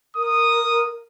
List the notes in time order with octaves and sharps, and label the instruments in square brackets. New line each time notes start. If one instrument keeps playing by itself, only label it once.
[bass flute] A#4 [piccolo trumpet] D#6